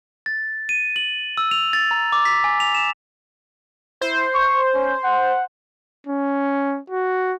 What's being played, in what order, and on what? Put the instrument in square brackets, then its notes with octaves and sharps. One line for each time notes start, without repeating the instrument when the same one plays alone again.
[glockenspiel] A6
D#7
F#7
E6
F7
A6
A#5
D6
B6
G#5
F7
E7
[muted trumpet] E4 [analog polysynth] C5
[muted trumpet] C#6
C#4
F#5
[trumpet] C#4
F#4